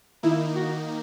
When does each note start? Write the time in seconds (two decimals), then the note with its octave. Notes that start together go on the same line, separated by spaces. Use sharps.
0.23 D#3 A#3 D#4 E4
0.56 F#4